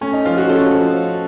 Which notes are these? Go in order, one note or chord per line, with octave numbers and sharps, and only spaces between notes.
A3 C#4
D#4
F3 F4
F#4
C#4 A4
F3